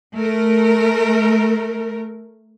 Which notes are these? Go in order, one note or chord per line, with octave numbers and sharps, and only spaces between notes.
A3 A#4